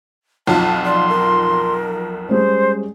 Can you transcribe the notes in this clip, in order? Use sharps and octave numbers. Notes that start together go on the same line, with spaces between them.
B1 F2 F4 A5
D5 C6
A#4
G3 G#3 C#4 C5